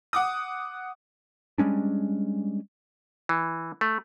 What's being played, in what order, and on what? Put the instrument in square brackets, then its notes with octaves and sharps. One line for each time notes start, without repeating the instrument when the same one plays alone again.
[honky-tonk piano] F#5 D6 D#6
[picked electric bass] G3 G#3 C#4 D4
[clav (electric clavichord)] E3
A3